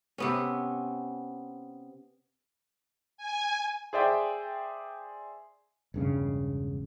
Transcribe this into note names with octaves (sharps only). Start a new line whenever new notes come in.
C3 B3 C#4
G#5
G#4 C5 D5 E5 G5
E1 G2 C#3